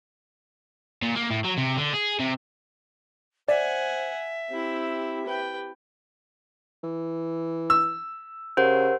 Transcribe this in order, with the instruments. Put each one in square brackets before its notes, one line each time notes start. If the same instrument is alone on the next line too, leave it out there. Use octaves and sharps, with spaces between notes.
[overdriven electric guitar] A#2
A#3
A2
F#3
C3
D3
G#4
C3
[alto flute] C5 [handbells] D5 [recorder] E5 [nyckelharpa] F#5 G#5
[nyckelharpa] C4 E4 [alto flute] G4
[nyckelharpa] B4 G5
[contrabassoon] E3
[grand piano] E6
[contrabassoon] C#3 [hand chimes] G4 A#4 F#5 [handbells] C5